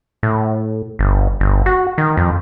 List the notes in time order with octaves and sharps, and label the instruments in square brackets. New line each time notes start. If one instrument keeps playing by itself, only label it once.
[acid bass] A2
G1
G1
F#4
D#3
F2